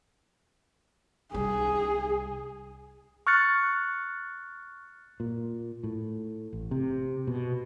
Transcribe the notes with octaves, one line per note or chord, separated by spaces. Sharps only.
C2 G3 G#4
C#6 F6 F#6 A6 C#7
A#2
A2
A1
C3
B2